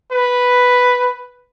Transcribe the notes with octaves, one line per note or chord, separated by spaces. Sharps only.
B4